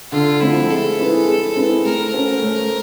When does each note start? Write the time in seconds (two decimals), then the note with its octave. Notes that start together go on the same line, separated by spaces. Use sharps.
0.12 D3 F4
0.41 F3 A3 C4 E4
0.70 G#3 A4
0.99 C4 E4 G#4 B4
1.28 G#3
1.56 C4 E4 G#4 B4
1.85 A3 A#4
2.13 C#4 F#4 A4 C5
2.42 A3